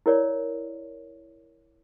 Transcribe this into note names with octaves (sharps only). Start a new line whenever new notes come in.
E4 A#4 C#5 D5